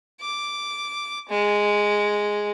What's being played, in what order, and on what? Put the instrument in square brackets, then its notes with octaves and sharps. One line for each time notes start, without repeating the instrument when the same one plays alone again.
[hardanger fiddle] D6
G#3